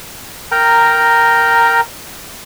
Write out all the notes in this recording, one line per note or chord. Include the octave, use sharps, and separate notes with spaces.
A#4 G5 A#5